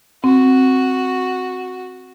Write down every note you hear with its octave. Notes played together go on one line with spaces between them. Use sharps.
C4 F#4